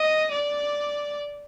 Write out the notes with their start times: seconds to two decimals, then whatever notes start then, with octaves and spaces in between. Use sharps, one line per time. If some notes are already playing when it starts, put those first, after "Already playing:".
Already playing: D#5
0.31 D5